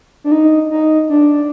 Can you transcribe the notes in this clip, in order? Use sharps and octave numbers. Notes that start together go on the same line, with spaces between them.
D4
D#4
D#4
D4